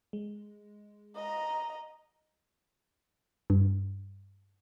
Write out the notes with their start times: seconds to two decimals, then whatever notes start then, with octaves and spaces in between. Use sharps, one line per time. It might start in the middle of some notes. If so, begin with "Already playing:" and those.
0.13 G#3
1.16 D#5 A#5
3.50 G2